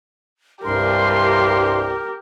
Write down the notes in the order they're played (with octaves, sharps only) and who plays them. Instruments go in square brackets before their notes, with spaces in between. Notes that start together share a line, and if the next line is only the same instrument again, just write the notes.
[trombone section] C2 G2 [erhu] G4 [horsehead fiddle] A#4 [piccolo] C6